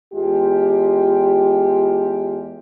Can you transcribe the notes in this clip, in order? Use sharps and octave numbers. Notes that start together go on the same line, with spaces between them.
E2 G#3 F4 G4